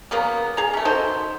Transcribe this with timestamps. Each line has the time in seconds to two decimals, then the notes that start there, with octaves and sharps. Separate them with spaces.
0.11 C#3 F#3 A#3 B3
0.57 G#4 A#5
0.74 A3 C#4
0.85 D#4 F#4 A4 C5